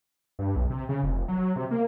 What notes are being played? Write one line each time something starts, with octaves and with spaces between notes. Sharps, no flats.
G2
B1
C3
C#3
F1
F#3
C3
A#3